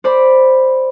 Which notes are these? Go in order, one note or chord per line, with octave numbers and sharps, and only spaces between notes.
C5 D5 B5